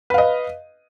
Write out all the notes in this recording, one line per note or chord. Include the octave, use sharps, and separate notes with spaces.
B4 D#5 F5